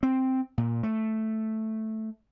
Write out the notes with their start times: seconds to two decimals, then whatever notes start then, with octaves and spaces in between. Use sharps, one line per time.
0.03 C4
0.58 A#2
0.83 A3